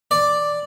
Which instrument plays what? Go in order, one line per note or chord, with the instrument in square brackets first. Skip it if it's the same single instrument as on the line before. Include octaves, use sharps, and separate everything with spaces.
[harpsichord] D5